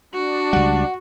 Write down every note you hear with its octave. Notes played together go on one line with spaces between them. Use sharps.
D4 F#4
C#2 G3 F#5